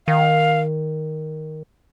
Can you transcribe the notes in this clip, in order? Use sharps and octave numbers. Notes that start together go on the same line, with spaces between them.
D#3 F5